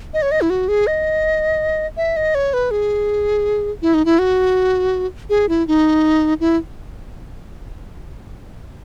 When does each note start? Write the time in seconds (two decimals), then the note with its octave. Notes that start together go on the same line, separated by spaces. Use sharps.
0.14 D#5
0.22 C#5
0.31 D#5
0.41 E4
0.50 F#4
0.68 G#4
0.87 D#5
1.97 E5
2.16 D#5
2.35 C#5
2.53 B4
2.71 G#4
3.82 E4
3.94 D#4
4.05 E4
4.19 F#4
5.30 G#4
5.49 E4
5.68 D#4
6.40 E4